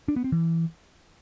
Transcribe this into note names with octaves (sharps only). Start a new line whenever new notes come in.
D4
B3
C4
E3